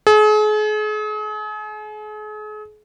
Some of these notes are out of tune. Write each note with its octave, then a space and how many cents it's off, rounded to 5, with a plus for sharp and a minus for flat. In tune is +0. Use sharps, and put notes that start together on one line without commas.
G#4 +40